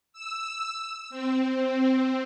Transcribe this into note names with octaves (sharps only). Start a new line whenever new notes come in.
E6
C4